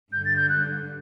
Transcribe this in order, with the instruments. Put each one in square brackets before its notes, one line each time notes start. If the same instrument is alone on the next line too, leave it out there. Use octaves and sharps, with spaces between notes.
[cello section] G2 D3 G3 [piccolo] G6
[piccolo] A6
G6
F#6